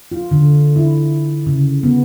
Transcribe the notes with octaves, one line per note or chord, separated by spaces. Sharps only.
F4
D3
E4
C#3
B3